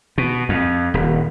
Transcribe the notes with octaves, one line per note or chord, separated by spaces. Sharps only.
B2
F2
D#1